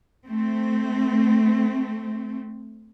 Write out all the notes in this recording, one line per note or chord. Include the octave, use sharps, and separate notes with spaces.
A3 C4